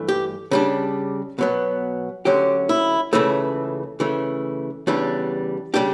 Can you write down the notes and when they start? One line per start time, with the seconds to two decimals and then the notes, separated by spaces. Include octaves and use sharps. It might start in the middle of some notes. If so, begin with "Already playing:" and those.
Already playing: G2 E3 A3
0.08 G4
0.51 C#3 G3 D4
1.39 B2 F#3 B3
2.25 D2 D3 F#3 C#4 G4
2.69 E4
3.13 C#2 C#3 E3 A3
4.00 C#3 E3 A3
4.87 E2 C#3 E3 G3 D4
5.74 C#3 G3 D4 G4